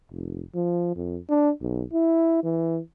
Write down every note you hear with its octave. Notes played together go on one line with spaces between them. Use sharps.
F1
F3
F2
D4
B1
E4
E3